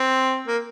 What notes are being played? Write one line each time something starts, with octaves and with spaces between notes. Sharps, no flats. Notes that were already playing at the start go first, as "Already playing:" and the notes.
Already playing: C4
A#3